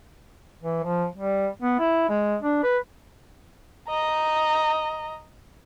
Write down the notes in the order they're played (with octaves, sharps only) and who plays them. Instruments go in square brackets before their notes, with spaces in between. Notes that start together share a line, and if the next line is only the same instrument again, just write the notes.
[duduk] E3
F3
G3
B3
E4
G#3
D4
B4
[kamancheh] D#5 A#5